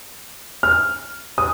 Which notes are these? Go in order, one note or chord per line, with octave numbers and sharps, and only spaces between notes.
F6
D#6